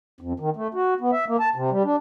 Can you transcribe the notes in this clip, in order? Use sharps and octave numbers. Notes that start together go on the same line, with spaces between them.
F2
D#3
A3
F#4
B3
E5
A#3
A5
C3
G3
D4